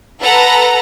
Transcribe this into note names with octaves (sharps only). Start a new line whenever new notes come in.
A4 B4 F#5 A#5